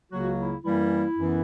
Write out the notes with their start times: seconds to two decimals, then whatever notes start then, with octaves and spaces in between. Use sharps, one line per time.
0.11 C#2 C#3 F#3 A#3 F#4
0.38 E4
0.64 F#2 E3 G3 A#3 E4
1.16 F#2 E3 B3